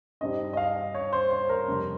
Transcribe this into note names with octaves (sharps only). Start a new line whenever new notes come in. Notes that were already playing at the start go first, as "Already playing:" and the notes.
G2 G3 C4 D#4 D#5
D#5
F5
C#5
C5
C5
A#4
F2 C3 G3